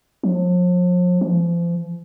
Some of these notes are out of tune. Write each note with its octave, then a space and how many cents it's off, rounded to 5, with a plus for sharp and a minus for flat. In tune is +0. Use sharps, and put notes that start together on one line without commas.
F3 +40
F3 -35